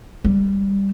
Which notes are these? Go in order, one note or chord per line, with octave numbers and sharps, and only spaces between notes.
G3